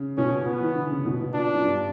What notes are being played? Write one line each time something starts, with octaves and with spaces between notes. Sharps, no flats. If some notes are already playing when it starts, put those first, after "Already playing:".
Already playing: C#3
B2 C#4
A#2
B3
E3
D3
C#3
B2
B2
A#2 D4
F#2
G2